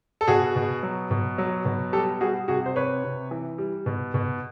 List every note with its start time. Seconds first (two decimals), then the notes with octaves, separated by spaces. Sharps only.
0.21 A4
0.27 B2 F#4 G#4
0.56 B2
0.83 F#3
1.11 B2
1.38 F#3
1.65 B2
1.93 G3 G4 A4
2.21 G3 F#4 G#4
2.48 C3 F#4 G#4
2.66 C5
2.76 C3 B4 C#5
3.04 C3
3.31 E3
3.58 G3
3.86 B2
4.14 B2